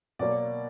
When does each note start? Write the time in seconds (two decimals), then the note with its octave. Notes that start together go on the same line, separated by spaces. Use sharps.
0.19 B2 F#3 A#3 D5